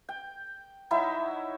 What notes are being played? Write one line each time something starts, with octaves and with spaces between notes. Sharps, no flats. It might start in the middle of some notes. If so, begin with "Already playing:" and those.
G5
F#3 D#4 E4 E5